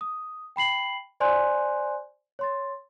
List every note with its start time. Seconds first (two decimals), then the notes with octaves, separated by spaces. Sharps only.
0.01 D#6
0.56 G5 B5 C7 F#7
1.20 C5 D5 G#5 C6 F#6 G6
2.39 C#5 C6 A6